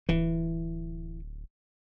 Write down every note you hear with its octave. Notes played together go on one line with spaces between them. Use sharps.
D1 E3